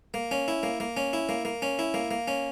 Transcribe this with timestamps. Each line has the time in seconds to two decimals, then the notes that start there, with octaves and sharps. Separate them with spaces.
0.14 A#3
0.31 C#4
0.48 E4
0.63 A#3
0.80 A#3
0.97 C#4
1.13 E4
1.29 A#3
1.45 A#3
1.62 C#4
1.79 E4
1.94 A#3
2.11 A#3
2.28 C#4